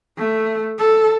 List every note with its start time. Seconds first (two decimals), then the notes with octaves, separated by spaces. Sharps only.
0.18 A3
0.78 A4